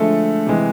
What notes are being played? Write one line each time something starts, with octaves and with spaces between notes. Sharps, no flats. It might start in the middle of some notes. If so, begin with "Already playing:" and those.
Already playing: D3 F3 G#3 A3 A4
C3 E3 G#3